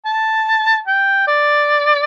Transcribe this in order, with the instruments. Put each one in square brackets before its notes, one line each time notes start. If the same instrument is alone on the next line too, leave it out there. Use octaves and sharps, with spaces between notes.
[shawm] A5
G5
D5